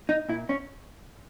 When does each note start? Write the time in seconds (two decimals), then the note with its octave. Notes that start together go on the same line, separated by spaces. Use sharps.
0.09 D#4
0.29 A#2 E4
0.49 C#4